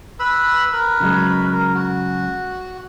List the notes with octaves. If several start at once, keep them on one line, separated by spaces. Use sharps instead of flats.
B4 B5 E6
A#4 B4
C#3 F#3 G#3
A#4
F#4